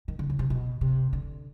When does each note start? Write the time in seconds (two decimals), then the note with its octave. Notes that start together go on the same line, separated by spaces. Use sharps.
0.08 D#3
0.19 D3
0.30 C#3
0.39 C3
0.50 B2
0.81 C3
1.13 D3